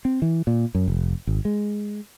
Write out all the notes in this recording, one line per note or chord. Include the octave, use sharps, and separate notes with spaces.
C4
E3
A#2
F#2
F1
G#1
G#3